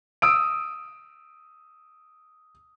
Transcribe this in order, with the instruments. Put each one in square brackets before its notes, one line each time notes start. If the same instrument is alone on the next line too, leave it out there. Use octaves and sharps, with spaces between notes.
[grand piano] D#6 E6 D7